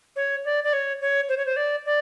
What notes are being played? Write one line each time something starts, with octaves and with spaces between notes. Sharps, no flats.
C#5
D5
D5
C#5
C#5
C5
C#5
C5
D5
D5